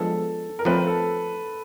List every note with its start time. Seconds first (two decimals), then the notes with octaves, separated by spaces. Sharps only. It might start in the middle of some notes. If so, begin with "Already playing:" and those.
Already playing: F3 G#3 B3 D4 A4
0.59 A#4
0.65 F3 A3 C4 B4
0.87 A4